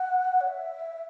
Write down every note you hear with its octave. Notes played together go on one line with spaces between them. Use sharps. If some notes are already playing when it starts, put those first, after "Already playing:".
Already playing: F#5
C#5
E5